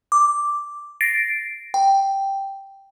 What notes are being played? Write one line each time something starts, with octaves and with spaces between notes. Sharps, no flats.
D6
A6 A#6 C7 D7
G5